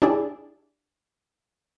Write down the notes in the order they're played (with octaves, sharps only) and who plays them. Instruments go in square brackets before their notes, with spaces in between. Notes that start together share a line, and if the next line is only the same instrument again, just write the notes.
[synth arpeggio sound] D4 E4 G4 G#4 D5